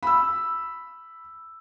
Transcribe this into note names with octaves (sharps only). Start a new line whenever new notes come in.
B5 E6